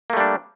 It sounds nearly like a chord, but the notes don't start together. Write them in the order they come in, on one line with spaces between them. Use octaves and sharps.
A#3 A3 G3 D4